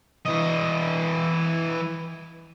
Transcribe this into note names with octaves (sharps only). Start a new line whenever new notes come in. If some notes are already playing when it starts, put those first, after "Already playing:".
E3 D#5